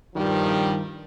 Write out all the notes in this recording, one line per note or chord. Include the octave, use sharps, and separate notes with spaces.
G2 D#3 F3 G3